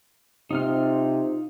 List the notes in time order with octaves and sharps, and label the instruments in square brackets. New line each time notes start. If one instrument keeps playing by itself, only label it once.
[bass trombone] C3 [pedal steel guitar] D#4 F4 F6